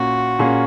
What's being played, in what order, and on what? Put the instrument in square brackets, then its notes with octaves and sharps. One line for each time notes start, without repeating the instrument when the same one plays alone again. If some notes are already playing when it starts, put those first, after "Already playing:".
Already playing: [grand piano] A#2 A#3 C#4 [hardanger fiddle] F#4
[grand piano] A#2 A#3 C#4 G#4